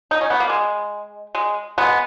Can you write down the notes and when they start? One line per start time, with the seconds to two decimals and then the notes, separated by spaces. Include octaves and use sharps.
0.11 D#4
0.21 C#4
0.30 B3
0.40 A#3
0.49 G#3
1.35 G#3
1.78 G#3 B3